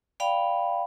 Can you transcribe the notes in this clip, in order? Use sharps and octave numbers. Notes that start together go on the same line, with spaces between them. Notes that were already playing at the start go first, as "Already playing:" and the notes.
D5 F5 G5 B5